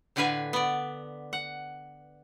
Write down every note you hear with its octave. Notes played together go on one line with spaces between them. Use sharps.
A2 D3 D4 B4 F5 G#5
B3 D5
F#5